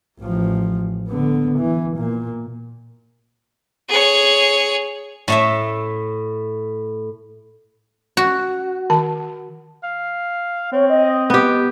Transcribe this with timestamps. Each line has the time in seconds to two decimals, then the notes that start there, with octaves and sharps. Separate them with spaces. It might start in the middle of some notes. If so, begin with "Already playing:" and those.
0.20 A1 F3
1.09 D3 B3
1.59 E3
1.97 A#2
3.89 G#4 C#5
5.28 A2 A3 E5
8.17 F#4
8.90 D#3 A5
9.83 F5
10.72 C4 C#5
10.90 D#5
11.30 B3 G4